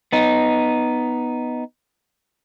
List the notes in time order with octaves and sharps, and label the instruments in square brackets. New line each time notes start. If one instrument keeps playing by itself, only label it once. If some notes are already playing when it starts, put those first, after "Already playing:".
[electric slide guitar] B3 D#4